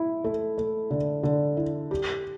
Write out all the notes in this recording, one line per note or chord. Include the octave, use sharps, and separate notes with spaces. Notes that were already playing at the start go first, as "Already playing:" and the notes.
Already playing: E4
A3
A3
D3
D3
E4
G4